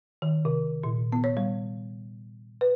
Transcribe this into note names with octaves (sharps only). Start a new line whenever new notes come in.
D#3
C3
A#2
B3
C#5
G3
B4